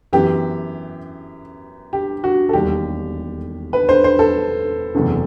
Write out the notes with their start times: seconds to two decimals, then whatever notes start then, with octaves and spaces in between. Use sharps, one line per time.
0.13 F#2 E3 B3 G4
1.93 G4
2.24 F#4
2.49 A4
2.53 E1 D#2 D#3 G3 G4
3.73 B4
3.89 C5
4.04 C5
4.19 A4
4.94 F#1 E2 C3 E3 A3